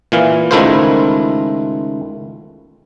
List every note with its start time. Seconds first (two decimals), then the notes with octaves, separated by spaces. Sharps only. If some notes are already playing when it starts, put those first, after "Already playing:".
0.12 A#2 E3 F5
0.51 C#2 D#3 A3 E4 F4 C5